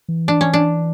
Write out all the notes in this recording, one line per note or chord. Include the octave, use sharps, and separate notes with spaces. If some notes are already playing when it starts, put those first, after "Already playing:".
E3
D4
C#4
D4